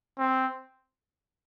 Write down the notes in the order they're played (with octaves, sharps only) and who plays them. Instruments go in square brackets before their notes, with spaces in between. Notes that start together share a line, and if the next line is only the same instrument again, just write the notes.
[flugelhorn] C4